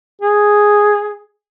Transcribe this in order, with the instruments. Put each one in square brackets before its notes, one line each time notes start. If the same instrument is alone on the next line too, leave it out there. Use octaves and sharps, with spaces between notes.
[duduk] G#4